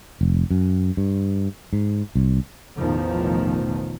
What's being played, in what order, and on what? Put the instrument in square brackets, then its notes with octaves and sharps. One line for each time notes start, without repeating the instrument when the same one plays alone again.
[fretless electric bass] F1
F#2
G2
G#2
C2
[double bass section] A1 E2 B2 D#3 F3